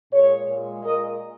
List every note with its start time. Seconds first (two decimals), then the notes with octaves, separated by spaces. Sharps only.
0.11 A#2 G#3 G#4 C#5
0.48 A#2 G#3
0.83 A#2 G#3 A#4 D#5